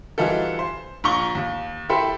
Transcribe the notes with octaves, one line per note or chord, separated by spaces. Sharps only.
E3 G3 D#4 F4 F#4 A4
C5
A#1 A#5 C#6 G7
D#2
E4 G4 A4 C5 G5 B5